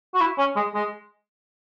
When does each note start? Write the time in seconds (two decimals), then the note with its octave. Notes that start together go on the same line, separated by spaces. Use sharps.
0.14 F#4
0.21 E4
0.38 C#4
0.56 G#3
0.75 G#3